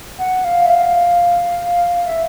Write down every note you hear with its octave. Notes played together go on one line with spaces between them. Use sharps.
F#5
F5
E5
F5
E5